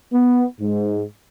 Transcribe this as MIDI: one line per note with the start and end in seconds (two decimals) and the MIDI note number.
0.12 0.44 59
0.60 1.01 44